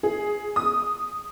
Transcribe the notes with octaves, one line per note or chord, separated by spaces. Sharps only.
G#4
D#6